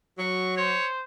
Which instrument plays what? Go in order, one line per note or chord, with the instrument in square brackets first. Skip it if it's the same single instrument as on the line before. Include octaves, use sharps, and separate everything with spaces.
[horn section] F#3 [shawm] C#6
[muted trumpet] C5 [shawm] C#5